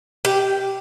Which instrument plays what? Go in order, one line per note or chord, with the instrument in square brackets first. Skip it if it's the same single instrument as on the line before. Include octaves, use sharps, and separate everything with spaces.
[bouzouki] G4